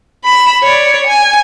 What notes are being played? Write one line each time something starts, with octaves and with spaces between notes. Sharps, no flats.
B5 E7
C#5 D5
G#5